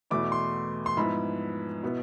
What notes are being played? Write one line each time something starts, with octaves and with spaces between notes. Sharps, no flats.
E2 B2 A3 E4 D6
C6
C6
G#2 F3 B3 E4 B5
B2 B3 E4